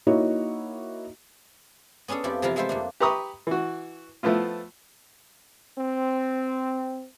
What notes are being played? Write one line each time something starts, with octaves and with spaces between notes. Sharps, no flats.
A#3 D#4 E4 F#4 C#5 D#5
B3 C#4 D4 G#4 A4
F2 F3 E4 G4 D5
C3 E3 F3 E4 A#4 F5
G#3 A3 E4 F4 C5 E5
F2 A#3 D4
G4 B4 A#5 C#6 D#6
E3 F#4
F3 A3 B3 E4 F4
C4